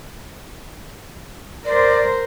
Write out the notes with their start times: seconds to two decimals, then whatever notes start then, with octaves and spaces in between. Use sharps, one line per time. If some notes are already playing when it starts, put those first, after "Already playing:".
1.65 A#4 C5 D5